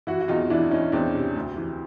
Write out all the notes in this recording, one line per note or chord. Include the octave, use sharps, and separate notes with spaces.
E3 E4 F#4
F#4
E2 D#4 F4
E3 D4 E4
E3 C#4 D#4
E2 C4 D4
C3
D2
E3